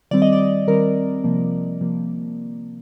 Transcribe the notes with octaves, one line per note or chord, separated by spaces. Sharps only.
D#3 G3 C4 D5
D#5
D5
D#3 G3 C4 A#4
C3 F3 A#3
C3 F3 A#3